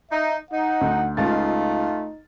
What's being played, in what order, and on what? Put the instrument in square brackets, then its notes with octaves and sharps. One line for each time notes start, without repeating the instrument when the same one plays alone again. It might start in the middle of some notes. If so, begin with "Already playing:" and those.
[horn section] D#4 [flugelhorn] E5
[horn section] D#4 [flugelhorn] F#5
[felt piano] D2
[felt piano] C#2 F5 A6 [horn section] A3 F4 [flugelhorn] D#4